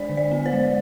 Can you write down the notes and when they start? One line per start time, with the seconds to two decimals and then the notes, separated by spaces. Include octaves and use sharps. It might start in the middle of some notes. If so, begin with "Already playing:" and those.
Already playing: G#3 D4 C5 D5
0.09 D3
0.17 D5
0.31 B3
0.46 C5
0.53 G#3